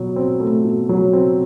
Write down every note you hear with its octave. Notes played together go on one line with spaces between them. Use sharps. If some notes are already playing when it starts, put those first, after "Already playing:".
Already playing: B2 F#3
C4
A3
B2
F#3
C4